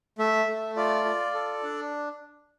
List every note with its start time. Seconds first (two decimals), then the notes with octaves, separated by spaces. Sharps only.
0.19 A3 E5
0.48 A3
0.76 F4 D5
1.05 F4
1.34 A4
1.63 D4